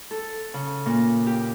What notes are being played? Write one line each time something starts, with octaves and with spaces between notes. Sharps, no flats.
A4
C#3
A#2
G4